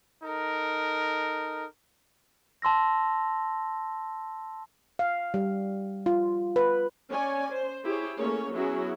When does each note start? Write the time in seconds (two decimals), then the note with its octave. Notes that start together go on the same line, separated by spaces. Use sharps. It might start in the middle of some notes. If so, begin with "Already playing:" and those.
0.24 D#4 A4 A#4
2.62 A5 C6 E6 A#6
4.99 F5
5.34 G3
6.06 F4
6.56 B4
7.09 C#4 C#5 D5 G#5
7.51 C5
7.85 E4 G4 G#4 C#5
8.19 A3 A#3 C#4 G#4 C#5
8.53 F#3 B3 C#4 E4 F#4 G#4